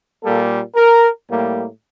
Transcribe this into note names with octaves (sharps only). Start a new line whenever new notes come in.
A#2 G3 A#3 A4
A#4
A2 G3 A#3